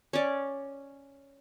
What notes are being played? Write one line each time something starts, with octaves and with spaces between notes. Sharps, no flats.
C#4 D5